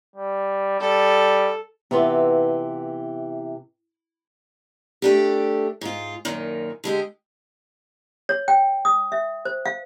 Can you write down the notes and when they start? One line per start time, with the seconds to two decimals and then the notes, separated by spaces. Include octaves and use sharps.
0.16 G3
0.80 G3 A4
1.91 C3 E3 B3 F4
5.02 A3 D4 G4
5.81 G#2 F4
6.25 F#2 A#2 D#3
6.84 D3 G#3 G4
8.29 C#5
8.48 G5
8.85 D#6
9.12 E5
9.45 C5
9.66 F5